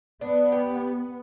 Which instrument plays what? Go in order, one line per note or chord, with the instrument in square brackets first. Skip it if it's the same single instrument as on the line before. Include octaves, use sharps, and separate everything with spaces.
[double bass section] B3 [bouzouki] D4
[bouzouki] G4